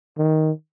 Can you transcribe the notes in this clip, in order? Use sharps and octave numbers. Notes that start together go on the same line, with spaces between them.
D#3